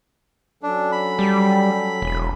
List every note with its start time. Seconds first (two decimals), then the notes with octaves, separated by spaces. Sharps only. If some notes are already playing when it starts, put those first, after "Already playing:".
0.63 F#3 C#4 D4 A4
0.92 B5
1.19 G3
2.02 E1